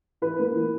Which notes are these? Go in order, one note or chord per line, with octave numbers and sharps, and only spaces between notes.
E3 B4
A#3
E3